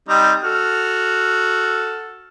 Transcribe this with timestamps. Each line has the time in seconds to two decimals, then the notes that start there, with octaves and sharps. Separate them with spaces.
0.09 G3 C4 D#4
0.44 F#4 A4 F6